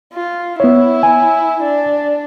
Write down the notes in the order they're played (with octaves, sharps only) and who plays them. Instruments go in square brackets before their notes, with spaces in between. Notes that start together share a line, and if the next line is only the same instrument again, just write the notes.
[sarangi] F4
[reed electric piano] B3 C#5 [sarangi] E4
[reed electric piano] G#5
[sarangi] D4